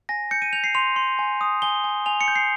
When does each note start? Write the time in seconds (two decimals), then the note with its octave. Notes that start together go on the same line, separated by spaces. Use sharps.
0.09 G#5 A#6
0.31 G6 C#7
0.42 D#7
0.53 G6 F7
0.64 C7
0.75 C6 F7
0.96 C6
1.19 G#5
1.41 D#6
1.62 G#5 G7
1.84 G#5
2.06 G#5 F7
2.21 C#7
2.28 G6
2.35 C7